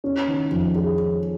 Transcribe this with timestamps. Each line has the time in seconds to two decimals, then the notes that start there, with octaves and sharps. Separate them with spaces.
0.04 C#4
0.28 D#3
0.51 F2
0.75 G#4